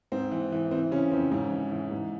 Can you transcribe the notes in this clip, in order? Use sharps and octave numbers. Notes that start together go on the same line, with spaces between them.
G#2 C4
E3
E3
E3 C4
C#3 C#4
F2 C4
G#2 C#4
E3
E3
G#2